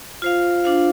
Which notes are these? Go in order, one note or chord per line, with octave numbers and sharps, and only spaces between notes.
F4 C5 F5
D4 F4 C5 F5